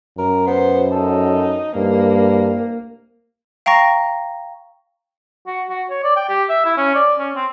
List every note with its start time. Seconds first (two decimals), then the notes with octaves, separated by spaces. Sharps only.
0.18 F#2 A#4
0.47 B3 C5
0.92 D#4 A4
1.76 C2 G2 A#3
3.66 F5 G5 A#5 C#6 A#6
5.47 F#4
5.69 F#4
5.90 C#5
6.04 D5
6.16 G5
6.29 G4
6.49 E5
6.65 E4
6.78 C#4
6.95 D5
7.19 C#4
7.36 C4